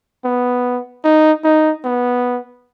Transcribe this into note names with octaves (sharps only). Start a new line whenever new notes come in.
B3
D#4
D#4
B3